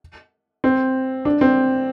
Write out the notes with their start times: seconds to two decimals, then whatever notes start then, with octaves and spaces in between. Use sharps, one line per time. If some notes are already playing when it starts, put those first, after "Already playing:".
0.64 C4
1.25 D4
1.41 C4